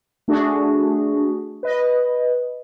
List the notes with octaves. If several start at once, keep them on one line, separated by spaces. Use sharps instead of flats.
A3 D4 F#4 G#4
B4 D#5